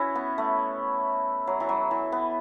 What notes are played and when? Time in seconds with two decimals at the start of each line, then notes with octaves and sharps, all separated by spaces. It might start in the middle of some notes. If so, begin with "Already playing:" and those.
Already playing: C#4 E4 F#4 B4
0.15 B3
0.38 A3
1.47 F#3
1.60 E3
1.69 F#3
1.91 E3
2.12 B3